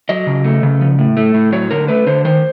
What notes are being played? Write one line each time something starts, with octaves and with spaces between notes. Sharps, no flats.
F#3 D#5
C#3
A3
C#3
F3
A2
A3
A2
F#3 C#5
D3 A#4
A3 B4
D3 C5
D#3 C5